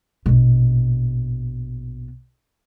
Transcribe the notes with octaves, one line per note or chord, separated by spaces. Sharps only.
A#1 B2